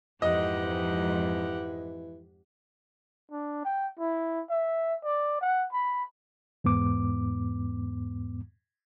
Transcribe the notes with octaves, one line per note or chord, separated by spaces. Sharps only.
F2 G#2 E3 G4 D#5 F#5
D4
G5
E4
E5
D5
F#5
B5
E2 G#2 B3 D6